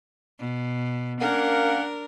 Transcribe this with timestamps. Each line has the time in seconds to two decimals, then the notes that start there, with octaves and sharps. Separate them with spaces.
0.39 B2
1.20 A#3 C#4 D4 A#4 F#5